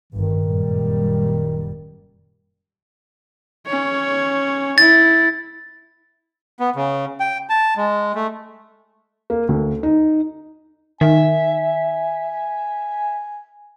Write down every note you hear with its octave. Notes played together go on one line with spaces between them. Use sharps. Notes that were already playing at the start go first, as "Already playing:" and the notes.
G1 G2 D#3
F#1 A#2 G3
C#4 C#5
E4 A6
B3
C#3
G5
A5
G#3
A3
A#3
D2
D#4
D#3 E5 G#5